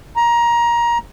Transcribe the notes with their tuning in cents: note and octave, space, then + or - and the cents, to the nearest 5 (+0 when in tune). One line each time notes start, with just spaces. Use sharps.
A#5 +20